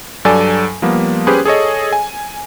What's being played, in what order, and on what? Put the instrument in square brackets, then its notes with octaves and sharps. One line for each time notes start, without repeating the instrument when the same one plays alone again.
[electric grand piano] G2 F#3 A4 D5 G#5
F3 G3 A#3 B3
C#4 G4 G#4 B4 C5
G#4 A4 C#5 D#5
G#5